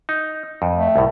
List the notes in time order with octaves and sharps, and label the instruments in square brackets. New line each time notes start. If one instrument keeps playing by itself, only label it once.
[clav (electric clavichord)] D#4
F2
[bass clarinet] A3
[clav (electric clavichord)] C2 A2